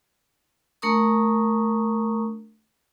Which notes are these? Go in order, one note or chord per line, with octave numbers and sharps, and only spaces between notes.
A3 D4 A#4 A#5 C#6 D#6